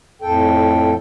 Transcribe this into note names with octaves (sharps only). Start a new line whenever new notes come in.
F2 A2 A4 G5